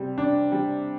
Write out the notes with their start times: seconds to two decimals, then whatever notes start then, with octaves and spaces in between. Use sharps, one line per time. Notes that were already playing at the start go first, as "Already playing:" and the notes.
Already playing: C3 G3
0.18 D4
0.52 G3